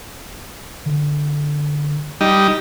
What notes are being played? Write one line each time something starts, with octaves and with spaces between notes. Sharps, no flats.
D3
G3 D#4